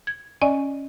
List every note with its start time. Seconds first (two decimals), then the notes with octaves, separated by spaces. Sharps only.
0.07 G#6
0.41 C#4 D5 D#5 G#5